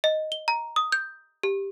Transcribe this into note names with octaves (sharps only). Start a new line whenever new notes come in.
D#5
G7
A#5
D#6
G6
G4